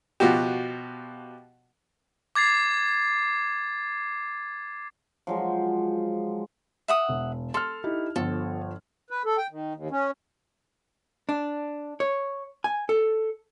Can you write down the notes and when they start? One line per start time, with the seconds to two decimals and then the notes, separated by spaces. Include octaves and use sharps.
0.20 B2 F3 F#4 G4
2.35 D6 G#6 A6 C7
5.27 F3 F#3 G#3
6.88 E5 F#5 D#6
7.09 E1
7.54 A4 C6 F6
7.84 D#4 E4 G4
8.16 G1 F3 A4
9.10 B4
9.25 A4
9.38 G5
9.51 D#3
9.75 D#2
9.91 C#4
11.29 D4
12.00 C#5
12.64 G#5
12.89 A4